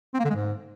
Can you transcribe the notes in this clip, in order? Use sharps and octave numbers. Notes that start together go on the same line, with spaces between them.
C4
A#3
D3
G#3
G#2